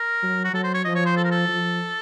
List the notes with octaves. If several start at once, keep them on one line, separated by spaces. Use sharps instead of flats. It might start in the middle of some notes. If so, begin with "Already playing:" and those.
Already playing: A#4
F#3
F#4
F#3 A4
C5
C#5
F3 D#5
C#5
C5
A4
A#4
A4
F3